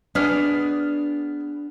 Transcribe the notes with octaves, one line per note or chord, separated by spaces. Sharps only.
B3 D4 G#4 D5 F6